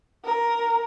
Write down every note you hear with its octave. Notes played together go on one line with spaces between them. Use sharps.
A#4